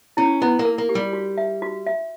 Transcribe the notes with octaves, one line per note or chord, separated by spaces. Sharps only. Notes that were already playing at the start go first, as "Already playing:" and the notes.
C#4 E4
B3 E4
A#3
A#4
A#3
G4
G3
F#4
E5
F#4
E5